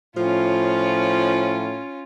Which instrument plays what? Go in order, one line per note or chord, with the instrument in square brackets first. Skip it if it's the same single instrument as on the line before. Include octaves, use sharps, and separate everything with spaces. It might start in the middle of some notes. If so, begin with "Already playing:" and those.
[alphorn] A2 [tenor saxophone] F3 [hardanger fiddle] C#4 F4